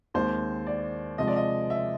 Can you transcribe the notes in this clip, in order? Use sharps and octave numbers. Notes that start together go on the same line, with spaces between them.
D#2 D#3 G#3 C4 C5
D5
C3 F3 G#3 D#5
D5
D#5
E5